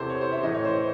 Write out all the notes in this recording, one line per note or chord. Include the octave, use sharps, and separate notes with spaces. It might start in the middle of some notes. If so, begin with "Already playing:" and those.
Already playing: E2 C3 E3 A4 C5
C#5
C5
E5
A2 E3 D#5
C#5
C5